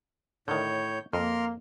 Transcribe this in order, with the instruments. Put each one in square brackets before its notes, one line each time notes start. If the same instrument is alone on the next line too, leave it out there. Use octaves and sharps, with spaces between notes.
[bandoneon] A2 C#5 G6 [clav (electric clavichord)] D3 D#3
[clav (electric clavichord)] F2 [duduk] A#3 [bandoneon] A#4 C6 F6